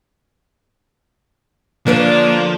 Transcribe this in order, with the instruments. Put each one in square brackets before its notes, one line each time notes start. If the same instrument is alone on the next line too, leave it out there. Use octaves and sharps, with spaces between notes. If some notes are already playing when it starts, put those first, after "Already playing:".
[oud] D3 B4 C#5 [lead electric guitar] F3 [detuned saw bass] A#3 [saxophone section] D4